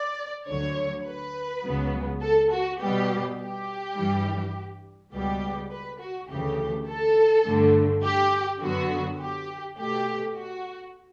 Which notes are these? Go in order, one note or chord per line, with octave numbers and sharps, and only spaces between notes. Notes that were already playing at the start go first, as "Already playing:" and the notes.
Already playing: D5
D2 D3 F#3 C#5
B4
C#2 C#3 F#3 B3
A4
F#4
B2 G3 B3 G4
G4
G2 E3 G3
C#2 B2 G3 B3 G4
B4
F#4
D2 C#3 E3 A3 G4
A4
G2 D3 A3
G4
F#2 D3 F#3 B3 F#4
G4
B2 A3 G4
F#4